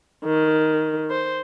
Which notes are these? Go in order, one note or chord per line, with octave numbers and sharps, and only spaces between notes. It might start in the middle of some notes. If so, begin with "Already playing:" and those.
D#3
C5